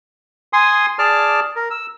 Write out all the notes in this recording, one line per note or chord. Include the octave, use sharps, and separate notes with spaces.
G#5 C6 D#6
G#4 D5 A5 D6 F6
A#4
E6